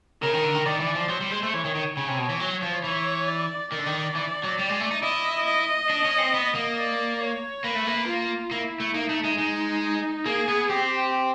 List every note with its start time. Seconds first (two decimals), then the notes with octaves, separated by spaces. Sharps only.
0.22 C#3 A#4
0.33 D#3
0.44 D3
0.55 D#3
0.66 D#3 D5
0.80 E3
0.95 F3
1.09 F#3 C5
1.21 G3
1.31 G#3
1.43 A3
1.53 E3 C#5
1.65 D#3
1.75 D#3
1.96 C#3 C#5
2.08 C3
2.18 B2
2.29 E3
2.40 F#3
2.62 F3
2.84 E3 C#5
3.28 D5
3.72 D#3 D5
3.79 D3
3.86 D#3
4.15 E3
4.44 F#3
4.59 G3
4.69 G#3
4.80 A3
4.91 D#4
5.03 E4 D#5
5.46 D#5
5.90 D4
6.05 C#4
6.18 C4
6.34 B3
6.55 A#3
6.77 D5
7.20 C#5
7.64 A#3 B4
7.75 A3
7.87 A#3
8.07 F4
8.51 A#3 E4
8.80 A3
8.94 A#3 D#4
9.09 A3
9.24 G#3
9.38 G#3 D#4
10.26 A#3 G#4
10.48 B3
10.69 C4 G4